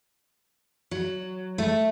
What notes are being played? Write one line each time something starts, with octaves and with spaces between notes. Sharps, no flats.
F#3
A3